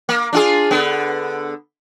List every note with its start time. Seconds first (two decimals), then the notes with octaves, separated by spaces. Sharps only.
0.09 A#3
0.33 D4 F4 G#4
0.71 D3 B3